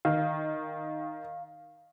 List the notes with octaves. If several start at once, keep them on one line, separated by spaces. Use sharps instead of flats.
D#3 F5